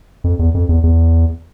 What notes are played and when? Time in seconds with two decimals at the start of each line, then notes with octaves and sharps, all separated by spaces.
0.24 F2
0.39 E2
0.55 F2
0.69 E2
0.84 E2